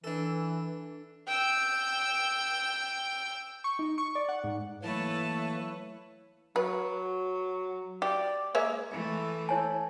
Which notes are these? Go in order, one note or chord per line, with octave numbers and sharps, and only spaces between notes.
E3 D4 A4
G5 E6
C#6
D#4
C#6
D5
F#5
G#2
E3 F#3 A3 A#3 E4 B4 C#5 A5
F#3 B4
G4 D5
G#3 A#3 C#5 E5
E3 A3
E4 C#5 G#5 A5